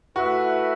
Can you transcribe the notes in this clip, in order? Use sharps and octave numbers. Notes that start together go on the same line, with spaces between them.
A3 E4 F#4 B4 E5